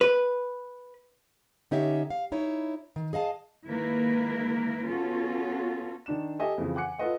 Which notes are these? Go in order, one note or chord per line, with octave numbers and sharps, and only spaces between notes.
B4
D3 C#4 D#4 G4 C#5 E5
F5
D#4 E4 C#5
D#3
G#4 D#5 F5 A5
D#3 G#3 A#3 E4 A#4 B4
B3 C#4 F4 F#4 A4
D#3 D4 E7
G4 A4 D#5 E5 G#5
F2 C#3 E3
F#5 G#5 D6 F#6 C#7
F4 A4 B4 D#5 F#5